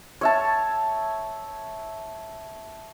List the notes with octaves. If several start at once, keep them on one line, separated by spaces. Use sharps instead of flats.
C#5 E5 A5